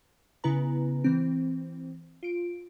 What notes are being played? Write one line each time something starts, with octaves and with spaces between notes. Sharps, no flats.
C#3 B3 E4 B4 A#5
E3 C4
F4 D7